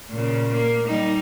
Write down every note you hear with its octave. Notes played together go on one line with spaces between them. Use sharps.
A#2 C#3
A#3
G3 D#4